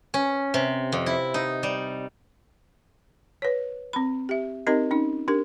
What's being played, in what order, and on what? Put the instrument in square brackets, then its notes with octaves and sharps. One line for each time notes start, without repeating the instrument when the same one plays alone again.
[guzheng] C#4
C3
F2
E4
D#4
G3
[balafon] B4 C#5
C4 B5
G4 E5
C4 D#4 G4 A#4 D#5
C#4 D#4
D4 G4 A#4